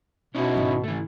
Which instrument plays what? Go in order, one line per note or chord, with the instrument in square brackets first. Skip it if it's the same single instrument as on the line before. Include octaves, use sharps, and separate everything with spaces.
[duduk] B2 [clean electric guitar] C#4 D#4 E4
[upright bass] G#1 C#3
[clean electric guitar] E3 A3